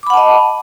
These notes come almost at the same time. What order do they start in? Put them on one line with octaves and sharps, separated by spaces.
D6 B5 F#5 A5 D#5